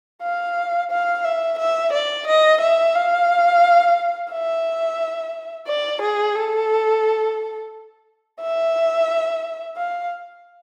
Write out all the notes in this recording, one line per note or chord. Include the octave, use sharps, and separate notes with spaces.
F5
F5
E5
E5
D5
D#5
E5
F5
E5
D5
G#4
A4
E5
F5